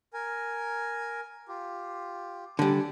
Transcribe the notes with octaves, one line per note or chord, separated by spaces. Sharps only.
A#4 G#5
F4 G4
D3 G3 G#5